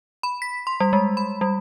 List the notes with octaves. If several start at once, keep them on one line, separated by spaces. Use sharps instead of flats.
B5
B6
C6
G3
G#3
B5
G3